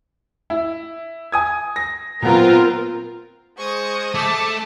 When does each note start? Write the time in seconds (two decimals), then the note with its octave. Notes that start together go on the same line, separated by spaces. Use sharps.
0.50 E4
1.32 G#5 D#6 G#6
1.76 A#6
2.22 A#2 F#3 B3 C4 F4 A#4
3.58 G#3 C5 C#6 D#6
4.15 A3 A5 D6